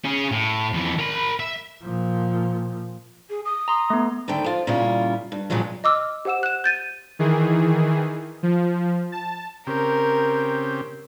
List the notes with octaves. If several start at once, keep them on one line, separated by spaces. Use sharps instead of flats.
C#4 G#4
A2
F2 E3
A#4 B5
E5
A#2 F3
G#4
D#6
A#5 C6
A3 B3
D2 D3 D#3 A3 G5
F3 F4
A#2 C#3 G3 C#4 E4 F4
G2
G2 A#2 C#3 F3 F#3 G#3
D#5 D6 E6 F6
G4 C5 F#5 E6 E7
F#6 E7
G6 A6 D#7
D#3 E3 G#4
F3
A5
C#3 C4 G4 A#4